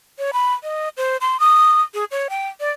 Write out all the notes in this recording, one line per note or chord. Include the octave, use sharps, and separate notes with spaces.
C#5
B5
D#5
C5
C6
D#6
G#4
C#5
G5
D5